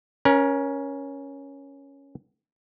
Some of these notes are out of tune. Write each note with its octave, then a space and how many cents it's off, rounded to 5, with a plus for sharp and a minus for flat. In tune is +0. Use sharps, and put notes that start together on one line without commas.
C#4 +0 A#4 +30 A#5 -10